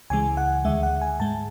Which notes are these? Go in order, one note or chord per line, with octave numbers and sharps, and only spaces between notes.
C#2 C#3 E3 G#3 G#5
F#5
D2 D3 G#3 E5
F#5
G#5
G#2 G#3 A5